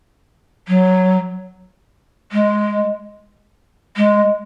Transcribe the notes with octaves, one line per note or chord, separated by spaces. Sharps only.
F#3
G#3
G#3